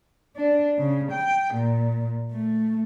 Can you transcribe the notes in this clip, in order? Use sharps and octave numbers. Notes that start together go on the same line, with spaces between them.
D4
C#3
G5
A#2
A3